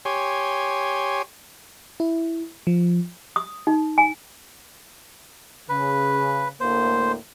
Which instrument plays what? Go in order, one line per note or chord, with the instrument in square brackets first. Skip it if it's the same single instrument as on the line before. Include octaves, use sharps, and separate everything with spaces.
[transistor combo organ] G4 C#5 G#5 C6
[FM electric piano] E4
F3
[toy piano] D#6
D#4
G#5
[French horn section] C#3 [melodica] B4
[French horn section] D2 A2 A#3 [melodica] C5